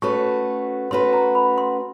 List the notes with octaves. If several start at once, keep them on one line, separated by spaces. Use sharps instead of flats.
A3 C#4 F#4 B4 C#6
A3 C#4 F#4 B4 C6
A#5
B5
C6